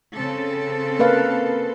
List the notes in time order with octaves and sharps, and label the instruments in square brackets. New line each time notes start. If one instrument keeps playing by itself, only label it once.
[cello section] C#3 C4 A4
[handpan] A#3 B4 F5